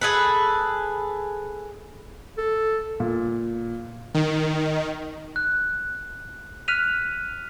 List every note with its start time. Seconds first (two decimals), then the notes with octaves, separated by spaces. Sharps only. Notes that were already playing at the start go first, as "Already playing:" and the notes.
0.01 G#4 A4 B4
2.38 A4
3.00 A#2
4.14 D#3
5.36 F#6
6.68 F6 F#6 B6 D#7 F7